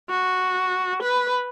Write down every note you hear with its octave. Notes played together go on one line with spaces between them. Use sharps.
F#4
B4